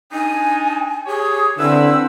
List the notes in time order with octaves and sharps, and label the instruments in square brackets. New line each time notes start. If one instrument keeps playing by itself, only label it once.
[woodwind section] D4 D#4 [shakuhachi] G#5
[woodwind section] G4 C#5 [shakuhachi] G#4
[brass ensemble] D3 E4 [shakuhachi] C4 [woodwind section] B4 E6